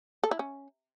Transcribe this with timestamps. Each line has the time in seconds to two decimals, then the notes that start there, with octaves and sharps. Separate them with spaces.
0.23 A4
0.31 E4
0.39 C#4